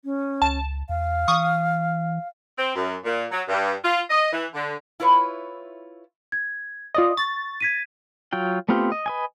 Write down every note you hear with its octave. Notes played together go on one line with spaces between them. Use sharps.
C#4
C#2 A5
E2 F5
E3 C#6 D#6
C4
F#2
A#2
F#3
G2
F4
D#5
E3
D3
E4 F4 B4 C#5
G#6
F4 D5 D#5 D#6
C#6 A6
G#6 B6 D#7
F#3 F4 G5
A3 B3 C4 F4 G4
D#5
B4 D#5 G#5